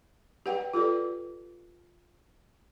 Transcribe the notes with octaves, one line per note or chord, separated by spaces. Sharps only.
G4 B4 F#5 G5
F4 G4 A4 B4 D5